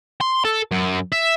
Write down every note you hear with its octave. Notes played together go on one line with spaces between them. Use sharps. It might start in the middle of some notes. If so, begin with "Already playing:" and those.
C6
A4
F#2
E5